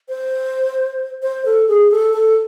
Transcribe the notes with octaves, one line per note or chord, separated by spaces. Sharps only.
C5
C5
A4
G#4
A4
A4